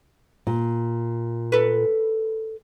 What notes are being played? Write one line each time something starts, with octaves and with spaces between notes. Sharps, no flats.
A#2
A4 B4